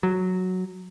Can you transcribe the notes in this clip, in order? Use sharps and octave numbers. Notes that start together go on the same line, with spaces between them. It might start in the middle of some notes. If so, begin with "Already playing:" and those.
F#3